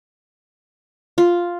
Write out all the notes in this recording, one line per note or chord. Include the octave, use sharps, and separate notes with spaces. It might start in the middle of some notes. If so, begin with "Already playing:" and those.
F4